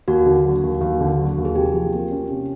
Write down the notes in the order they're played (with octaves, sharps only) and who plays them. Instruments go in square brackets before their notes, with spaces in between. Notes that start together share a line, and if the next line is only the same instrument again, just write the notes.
[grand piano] D#2 [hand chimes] F#4
[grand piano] D3
F#3
D#2
D#2
D3
F#3
D#2
[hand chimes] G#4
[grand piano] C3 [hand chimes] G4
[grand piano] F3
A#3
C#4
C3